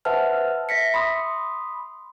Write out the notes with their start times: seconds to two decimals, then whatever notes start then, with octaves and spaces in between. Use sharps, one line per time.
0.05 B4 C5 E5 F#5 A5 F6
0.69 E5 A#6 B6 C#7
0.94 B5 C6 D#6